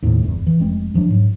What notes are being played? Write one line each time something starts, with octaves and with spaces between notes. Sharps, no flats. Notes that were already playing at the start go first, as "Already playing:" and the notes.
D#2 A2 C3
G1 E2 G2
E3
F1 G#3 C4
E1 F3 F#3 D4
G#2 F#3